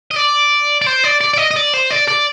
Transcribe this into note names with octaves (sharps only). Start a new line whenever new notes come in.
D#5
D5
D5
C5
D5
D5
D5
D#5
D#5
D5
C5
D5
D5